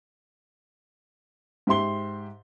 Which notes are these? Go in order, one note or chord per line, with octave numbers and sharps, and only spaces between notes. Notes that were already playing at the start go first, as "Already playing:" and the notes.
G#2 G4 E5 C6 G7